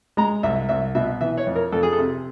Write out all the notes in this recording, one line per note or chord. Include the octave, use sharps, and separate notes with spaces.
G#3 A#5
C2 E5
C2 E5
B2 E5
E3 E5
C#5
F2
A#4
F2 A4
G#4
A4
C3